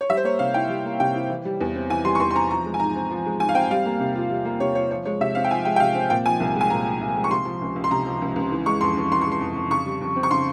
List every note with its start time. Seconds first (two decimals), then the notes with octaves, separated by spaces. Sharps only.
0.01 C#5
0.10 G3 E5
0.17 C5
0.24 A#3 C#5
0.39 C3 F5
0.54 E4 G5
0.69 G3
0.85 A#3
1.00 C3 G5
1.15 E4
1.29 E3
1.45 G3
1.61 E2
1.75 C4
1.90 E3 G#5
2.05 G3 C6
2.15 C#6
2.20 E2 C6
2.31 C6
2.35 C4 A#5
2.51 F3 A#5
2.65 G#3
2.74 G#5
2.80 G#2 A#5
2.96 C4
3.11 F3
3.26 G#3
3.40 G#2 G#5
3.49 F5
3.55 C4 G5
3.71 G3 F5
3.86 A#3
4.00 C3
4.15 F4
4.30 G3
4.45 A#3
4.60 C3 C#5
4.75 F4 C#5
4.91 F3 C#5
5.05 G#3 C#5
5.21 C3 E5
5.35 C4 F5
5.44 G5
5.51 F3 G#5
5.65 G#3 G5
5.76 G5
5.80 C3 F5
5.95 C4
6.10 A#2 G5
6.26 F3 G#5
6.40 C2
6.56 G#3 G#5
6.70 A#2 A#5
6.85 F3
7.01 C2
7.16 G#3
7.24 C#6
7.30 C3 C6
7.45 F3
7.61 C#2
7.76 C#2
7.84 C6
7.91 C3 A#5
8.06 F3
8.22 C#2
8.36 C#2
8.51 E3
8.66 G#3 C#6
8.81 F2 C6
8.97 F2
9.12 E3 C6
9.21 G#3 C#6
9.32 C6
9.41 F2
9.56 F2
9.71 C#3 C#6
9.86 G3
10.01 F2
10.16 C4
10.23 C#6
10.31 C#3 C6